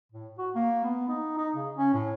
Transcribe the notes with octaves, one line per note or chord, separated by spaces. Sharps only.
A2
F#4
A#3
B3
D#4
D#4
C#3
C#4
A2